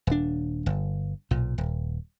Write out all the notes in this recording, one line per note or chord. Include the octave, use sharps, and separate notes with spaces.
D#1 D4
G1
B1 A#2
D#1